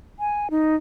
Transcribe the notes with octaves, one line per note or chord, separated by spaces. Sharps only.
G#5
D#4